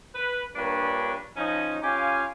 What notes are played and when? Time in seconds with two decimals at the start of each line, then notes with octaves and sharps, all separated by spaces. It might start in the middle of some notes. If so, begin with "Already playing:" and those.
0.15 B4
0.56 G2 A#2 D4 A#4 B4 C#5
1.37 F3 C#4 D#4
1.83 C#4 F4 G4 F5 G#5